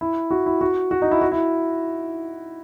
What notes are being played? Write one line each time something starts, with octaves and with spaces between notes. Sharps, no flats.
E4
F#4
E4
F#4
F#4
D#4
E4
F#4
E4